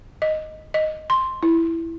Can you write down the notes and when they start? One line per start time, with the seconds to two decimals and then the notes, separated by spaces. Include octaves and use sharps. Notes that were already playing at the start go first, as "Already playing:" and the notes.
0.22 D#5
0.74 D#5
1.10 C6
1.43 E4